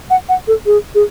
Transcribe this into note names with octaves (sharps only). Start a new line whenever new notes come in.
F#5
F#5
A4
G#4
G#4